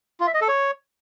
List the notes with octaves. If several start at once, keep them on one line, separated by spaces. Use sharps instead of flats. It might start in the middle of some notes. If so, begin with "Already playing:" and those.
F4
E5
D#5
A4
C#5